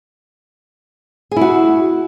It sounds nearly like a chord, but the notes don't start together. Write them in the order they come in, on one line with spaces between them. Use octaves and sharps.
G#4 E4 F#4